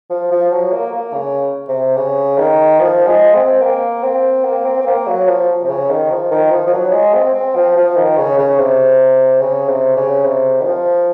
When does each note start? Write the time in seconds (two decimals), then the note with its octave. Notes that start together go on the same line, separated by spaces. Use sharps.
0.10 F3
0.31 F3
0.52 F#3
0.72 A#3
0.93 A#3
1.13 C#3
1.68 C3
1.97 C#3
2.38 D#3
2.80 F3
3.07 G#3
3.35 C4
3.62 A#3
4.04 C4
4.45 A#3
4.66 C4
4.82 C4
4.87 A#3
5.07 F#3
5.28 F3
5.63 C3
5.69 C#3
5.90 D#3
6.11 F3
6.31 D#3
6.51 F3
6.67 F3
6.73 F#3
6.93 G#3
7.14 C4
7.34 C4
7.55 F3
7.76 F3
7.96 D#3
8.17 C#3
8.38 C#3
8.59 C3
9.41 C#3
9.69 C3
9.97 C#3
10.24 C3
10.61 D#3
10.65 F3